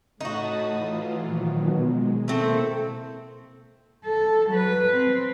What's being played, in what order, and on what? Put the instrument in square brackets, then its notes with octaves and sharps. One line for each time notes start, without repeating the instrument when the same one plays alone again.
[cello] A2 [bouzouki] D#4 F#4 [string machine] A5 B5 D#6
[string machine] E3 F4
[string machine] A#2 D#3 F#3 [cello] F3
[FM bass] B2 [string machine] G#3
[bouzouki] A3 C4 [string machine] A#3 E4 [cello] A4
[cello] A4
F#3 B4
C4